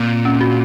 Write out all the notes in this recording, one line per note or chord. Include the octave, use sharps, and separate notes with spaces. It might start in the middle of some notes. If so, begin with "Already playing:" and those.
Already playing: A#2 C4
C#4
F#4